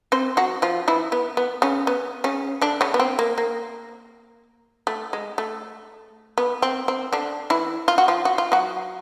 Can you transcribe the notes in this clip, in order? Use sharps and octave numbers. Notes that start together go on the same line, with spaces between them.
C4 C5
F#3 F#4
F3 F4
E3 E4
B3
B3
C#3 C#4
B3
C#3 C#4
D3 D4
C#3 C#4
B3
C4
A#3
A#3
A3
G#3
A3
B3
C4
C4
D3 D4
E3 E4
F4
F#4
F3 F4
F#4
F4
F#3 F#4